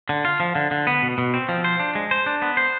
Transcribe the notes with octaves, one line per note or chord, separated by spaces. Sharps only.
D3
F4
F3
D3
D3
B3
B2
B2
C4
F3
C5
D4
G#3
C5
D4
B3
C5